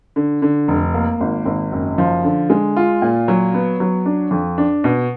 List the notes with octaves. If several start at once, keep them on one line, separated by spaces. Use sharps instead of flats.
D3
D3
F1
A#3
G#1
G#1
F#1
F3
D3
G#3
F4
A#2
F#3
B3
F#3
D4
F2
D4
B2